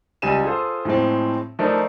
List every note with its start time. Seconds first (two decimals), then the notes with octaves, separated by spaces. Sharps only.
0.22 C#2 G3 G#5 D#7 E7
0.44 F4 G#4 A4 C5 F5
0.85 A2 F3 G#3 C4
1.59 F3 A3 D4 D#4 A#4